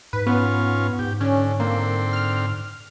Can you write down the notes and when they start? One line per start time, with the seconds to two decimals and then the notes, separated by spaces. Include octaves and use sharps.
0.13 G#2 B4
0.27 B3 C#4 F4
0.99 G#2 G4
1.21 D3 C#4
1.60 D3 A#3 C4
2.13 F6